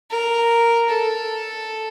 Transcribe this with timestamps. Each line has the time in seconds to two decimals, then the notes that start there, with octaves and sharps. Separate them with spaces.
0.10 A#4
0.89 A4